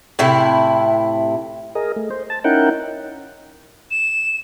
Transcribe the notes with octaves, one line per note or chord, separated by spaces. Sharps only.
A2 C3 E4
G#4 A#4 D#5
A3
C5
A5
C#4 D#4 E4 A#4 F#5 G5
E7